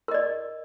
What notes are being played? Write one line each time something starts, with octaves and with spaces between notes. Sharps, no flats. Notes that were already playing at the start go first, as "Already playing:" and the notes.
A#4 D5 D#5